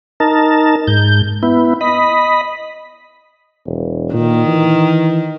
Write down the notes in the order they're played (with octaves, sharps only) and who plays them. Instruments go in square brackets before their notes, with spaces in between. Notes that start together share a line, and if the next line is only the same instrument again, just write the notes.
[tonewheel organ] D#4 A#4 A5
G#2 G6
B3 E4
D#5 B5
[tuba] E1
[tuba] A#2 [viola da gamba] D#3
[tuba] E3